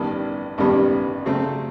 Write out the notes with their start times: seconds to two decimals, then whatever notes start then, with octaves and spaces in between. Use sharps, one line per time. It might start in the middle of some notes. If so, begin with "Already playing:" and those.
Already playing: A1 G2 D#3 G3 B3
0.58 A1 G2 D#3 G3 B3
1.26 C#3 F#3 A3 C4